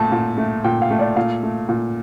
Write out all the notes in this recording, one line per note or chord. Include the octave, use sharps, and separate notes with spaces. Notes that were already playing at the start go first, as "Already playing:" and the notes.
Already playing: A#2 A3 A5
A#2
A3
A#2 G5
F5
A3
D5
A#2 F5
A3
A#2